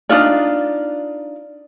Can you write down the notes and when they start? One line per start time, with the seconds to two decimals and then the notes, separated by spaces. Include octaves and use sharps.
0.09 D4 D#4 F4 D5